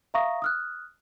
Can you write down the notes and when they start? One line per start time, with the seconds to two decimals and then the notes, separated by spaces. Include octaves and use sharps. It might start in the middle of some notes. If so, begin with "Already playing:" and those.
0.14 E5 F5 A#5 C#6 D#6 A#6
0.42 D#6 F6 F#6